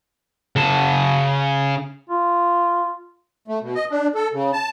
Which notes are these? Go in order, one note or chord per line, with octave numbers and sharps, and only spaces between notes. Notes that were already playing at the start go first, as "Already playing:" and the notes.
C#3 A5
F4
A3
B2
D#5
D4
A4
C#3
A5